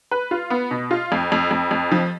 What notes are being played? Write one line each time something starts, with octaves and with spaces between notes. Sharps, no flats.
B4
F4
B3
B2
F4
F2
F2
F2
F2
F3